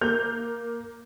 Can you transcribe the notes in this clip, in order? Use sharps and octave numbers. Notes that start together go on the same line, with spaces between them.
A#3 G6 F7